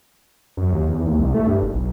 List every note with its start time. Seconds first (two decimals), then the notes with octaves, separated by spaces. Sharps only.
0.57 F#2
0.72 D#2
0.88 E2
1.07 D#2
1.19 C2
1.34 A3
1.47 G2
1.62 F#1
1.74 B1